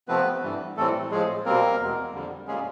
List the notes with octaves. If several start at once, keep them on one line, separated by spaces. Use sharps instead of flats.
C3 F3 A3 B3 C4 B4
G2 E3 G3
A2 E3 G3 A3 C4 A4
A2 F3 G#3 G#4
B2 G3 A#3 C4 A#4
E2 B2 G#3 B3
F2 D3 G3
A#2 G3 G#3 A#3 C#4 G#4